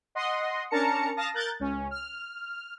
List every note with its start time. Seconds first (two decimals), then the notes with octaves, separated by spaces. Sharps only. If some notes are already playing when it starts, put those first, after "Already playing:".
0.15 D#5 F#5 C6 D#6
0.71 C#4 D4 A#4 A5 A#5 C#7
1.17 F5 A5 D#6 A#6
1.34 A#4 F#6 G6 A6
1.60 C#2 C#4
1.90 F6